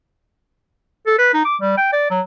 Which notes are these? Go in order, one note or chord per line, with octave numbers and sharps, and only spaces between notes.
A4
B4
D#4
D6
G3
G5
D5
F#3